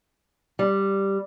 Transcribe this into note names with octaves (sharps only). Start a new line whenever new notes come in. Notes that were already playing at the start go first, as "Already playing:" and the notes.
G3